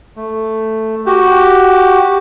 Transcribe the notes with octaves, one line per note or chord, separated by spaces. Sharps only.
A3
F#4 G4